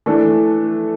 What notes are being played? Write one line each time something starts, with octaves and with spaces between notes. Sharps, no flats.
E3 A3 D4 A4